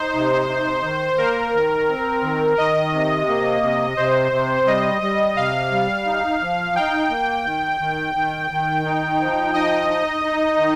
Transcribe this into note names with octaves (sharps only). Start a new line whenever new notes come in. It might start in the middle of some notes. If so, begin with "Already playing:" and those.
Already playing: D#4 C5
C3
D#4
D#3
A#3 A#4
D#3
C4
D#3
D#3 D#5
C3
A#3
C3
C3 C5
C3
G3 D#5
G3 D#5
C3 F5
G3
D#4
F3
D#4 G5
A#3
D#3
D#3
D#3
D#3
D#4
F3
D#4 D#5
D#4
D#4
D#3